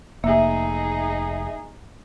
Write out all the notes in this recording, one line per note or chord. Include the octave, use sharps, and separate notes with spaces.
F1 A#3 D#4 G#4 E5